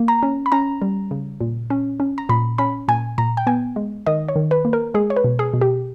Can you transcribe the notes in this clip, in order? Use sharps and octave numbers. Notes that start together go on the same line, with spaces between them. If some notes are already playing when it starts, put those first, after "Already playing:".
Already playing: A#3
A#5
C#4
B5
C#4 A#5
G3
C#3
A#2
C#4
C#4
A#5
A#2 B5
C#4 B5
A#2 G#5
A#2 A#5
G5
B3 G#5
G#3
D#3 D#5
C#5
D#3
B4
A#3
A#4
G#3 G#4
C#5
B4
B2
G#4
B2
G4